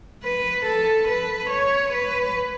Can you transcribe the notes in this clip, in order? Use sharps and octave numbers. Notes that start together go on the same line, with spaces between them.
B4
A4
B4
C#5
B4